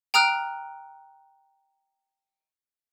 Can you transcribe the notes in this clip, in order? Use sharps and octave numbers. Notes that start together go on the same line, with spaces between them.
G5 A#5 D#6 F6 F#6 D7